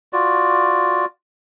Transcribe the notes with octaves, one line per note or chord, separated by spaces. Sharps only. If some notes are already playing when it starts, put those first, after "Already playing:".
F4 F#4 D5